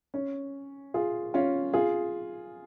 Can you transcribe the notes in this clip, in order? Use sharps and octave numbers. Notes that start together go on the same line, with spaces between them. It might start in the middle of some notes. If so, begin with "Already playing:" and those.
C#4
F4 G#4
C#4 F4
F4 G#4